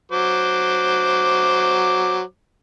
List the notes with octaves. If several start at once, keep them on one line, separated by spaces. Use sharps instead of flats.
F#3 C5 D6